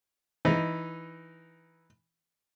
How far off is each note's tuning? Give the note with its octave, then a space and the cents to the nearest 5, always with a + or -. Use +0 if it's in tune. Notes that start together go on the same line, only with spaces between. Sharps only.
E3 +0 D#4 +0